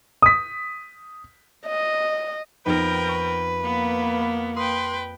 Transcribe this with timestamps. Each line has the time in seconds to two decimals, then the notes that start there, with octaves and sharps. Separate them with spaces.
0.22 D#6 B6
1.67 D#5
2.66 F2 B3 D#4 A#4 B4 G5
3.09 C#6
3.64 A#3 B3 C#7
4.56 B4 G5 C6 D#6